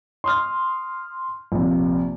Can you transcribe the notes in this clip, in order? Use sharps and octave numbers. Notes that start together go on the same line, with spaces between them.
C6 D#6 F6
A#1 C3